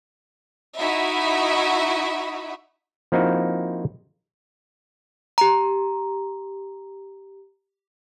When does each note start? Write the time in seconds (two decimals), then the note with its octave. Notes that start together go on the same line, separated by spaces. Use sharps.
0.78 D#4 E4 F#4 D#5 E5 B5
3.12 F3 A#3 C4 D#4 E4 F#4
5.38 G4 A#5